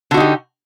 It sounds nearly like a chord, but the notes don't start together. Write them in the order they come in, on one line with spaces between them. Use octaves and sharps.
D3 F#4 D#4 G4